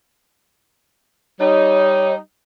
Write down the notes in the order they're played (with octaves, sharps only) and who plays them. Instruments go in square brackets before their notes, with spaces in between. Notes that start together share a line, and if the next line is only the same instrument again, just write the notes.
[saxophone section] G3 D#4 [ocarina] C#5